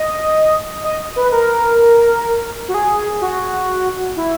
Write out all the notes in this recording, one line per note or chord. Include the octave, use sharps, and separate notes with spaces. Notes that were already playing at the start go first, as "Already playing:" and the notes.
Already playing: D#5
D#5
B4
A#4
F#4
G#4
F#4
E4